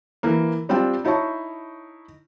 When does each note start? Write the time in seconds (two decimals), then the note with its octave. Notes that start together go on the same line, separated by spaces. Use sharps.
0.23 E3 A#3
0.69 G3 C4 D4 F4 G5
1.04 D#4 E4 C#5 A5 C#6